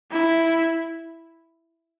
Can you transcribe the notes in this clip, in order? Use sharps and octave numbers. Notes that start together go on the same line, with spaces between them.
E4